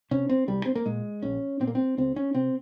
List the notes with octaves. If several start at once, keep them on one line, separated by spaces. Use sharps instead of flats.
C3 C#4
C4
C2 G3
C4
A#3
A#2 G#3
A#1 C#4
A#2 C4
A#3
C4
C#2 C4
C#4
C3 C4